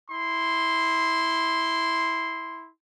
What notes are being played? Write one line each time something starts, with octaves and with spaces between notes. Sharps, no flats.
E4 C6